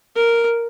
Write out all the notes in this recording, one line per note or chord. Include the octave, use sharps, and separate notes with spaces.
A#4